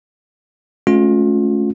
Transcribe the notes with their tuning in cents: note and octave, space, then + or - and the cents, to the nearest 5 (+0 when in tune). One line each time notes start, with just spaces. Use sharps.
A3 -35 C#4 +0 F4 +35